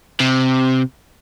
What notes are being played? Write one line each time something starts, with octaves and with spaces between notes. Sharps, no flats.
C3